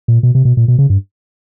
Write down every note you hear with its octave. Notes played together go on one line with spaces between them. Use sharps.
A#2
B2
C3
B2
A#2
B2
C#3
G2